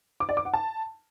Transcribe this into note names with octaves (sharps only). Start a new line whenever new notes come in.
D6
D5
D6
F#5
A5